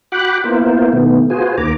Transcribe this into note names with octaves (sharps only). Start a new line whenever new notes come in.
F#4 F#5 G5 B5 D6 F#6
A#3 B3 E4 F4 A#4 C5
B2 D#3 A3 B3
F4 F#4 G#4 B4 C5 G#5
D2 D#3 A#3 A#5 D6